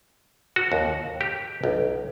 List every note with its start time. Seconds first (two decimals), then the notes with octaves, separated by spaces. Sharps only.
0.56 F#4
0.72 D#2
1.21 G4
1.64 B1